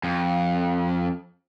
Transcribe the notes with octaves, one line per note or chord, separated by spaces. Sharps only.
F2